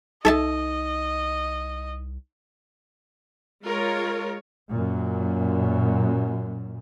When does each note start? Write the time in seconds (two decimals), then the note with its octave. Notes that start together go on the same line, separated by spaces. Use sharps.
0.25 C2 D#4 A4 D#5 E5 A5
3.64 G#3 F4 A#4 C#5
4.70 F#2 A#2